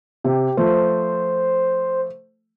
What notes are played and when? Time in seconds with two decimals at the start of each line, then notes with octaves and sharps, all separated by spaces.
0.24 C3 G4
0.57 F3 A3 C5